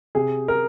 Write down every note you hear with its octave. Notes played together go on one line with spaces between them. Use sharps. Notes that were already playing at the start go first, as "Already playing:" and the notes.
C3 G#4
A#4